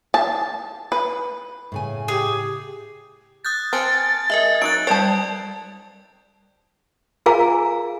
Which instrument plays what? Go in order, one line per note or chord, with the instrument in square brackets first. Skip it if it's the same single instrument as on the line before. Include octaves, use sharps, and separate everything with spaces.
[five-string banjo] A5
B4
[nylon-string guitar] A2 C#3 G#5
[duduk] G4 [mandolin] G#4
[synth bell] D#6 F#6 G6 [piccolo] A6
[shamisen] C4 [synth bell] G#5 A5 F6
[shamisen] G#3 [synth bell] A#4 D#5 E5
[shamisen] F#3 D#4 [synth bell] F#6 D7
[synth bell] G3 D5 G5 [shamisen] C#5 A5
[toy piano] F4 G#4 A#4 F5 G#5 A#5